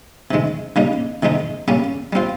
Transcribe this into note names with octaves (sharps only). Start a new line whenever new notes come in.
C3 D#3 G#3
C#3 G3 A#3 D#4
C3 D#3 G#3 D#4
C#3 G3 A#3 C#4
G3 C4 F4